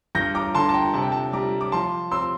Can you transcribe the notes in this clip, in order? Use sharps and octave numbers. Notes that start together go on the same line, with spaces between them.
G2 G6 A#6
A#5 D6
D3 A5 C6
A5
G5 A#5
C3 A5
G5
A5
G3 A#5 D6
D6
F3 A5 C6
C4 C6 E6